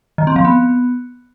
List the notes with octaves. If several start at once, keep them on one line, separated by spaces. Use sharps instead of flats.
D#3
C4
F3
B3